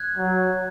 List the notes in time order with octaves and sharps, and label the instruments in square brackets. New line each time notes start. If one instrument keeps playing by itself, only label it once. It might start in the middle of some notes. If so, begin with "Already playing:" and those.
Already playing: [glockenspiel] F#6 G#6
[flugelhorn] F#3